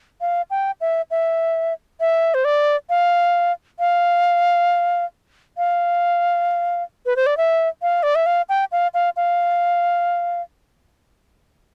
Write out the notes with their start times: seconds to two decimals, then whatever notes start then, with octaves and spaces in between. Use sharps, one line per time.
0.21 F5
0.50 G5
0.81 E5
1.11 E5
2.00 E5
2.34 C5
2.45 D5
2.90 F5
3.79 F5
5.58 F5
7.06 B4
7.16 C5
7.26 D5
7.37 E5
7.82 F5
8.03 D5
8.15 E5
8.26 F5
8.49 G5
8.72 F5
8.94 F5
9.16 F5